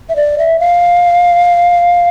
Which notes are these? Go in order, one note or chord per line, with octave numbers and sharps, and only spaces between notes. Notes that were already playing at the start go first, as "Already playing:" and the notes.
E5
D5
E5
F5